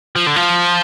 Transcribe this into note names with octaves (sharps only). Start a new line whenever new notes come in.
F3
D3
F3